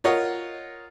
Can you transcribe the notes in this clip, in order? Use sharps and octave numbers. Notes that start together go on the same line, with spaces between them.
F4 A#4 C#5 D#5 F#5